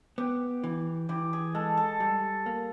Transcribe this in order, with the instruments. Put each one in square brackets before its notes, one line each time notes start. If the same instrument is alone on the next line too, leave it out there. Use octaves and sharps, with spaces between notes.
[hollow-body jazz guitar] B3 [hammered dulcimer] G4
[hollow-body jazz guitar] E3
[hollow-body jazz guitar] E3 [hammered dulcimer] G4
[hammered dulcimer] G#4
[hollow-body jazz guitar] G#3 [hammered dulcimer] A4
[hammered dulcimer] A4
[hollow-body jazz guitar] G3
A#3